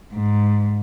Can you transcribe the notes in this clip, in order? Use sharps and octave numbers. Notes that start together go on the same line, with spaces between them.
G#2